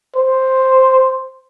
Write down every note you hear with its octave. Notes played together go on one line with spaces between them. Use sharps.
C5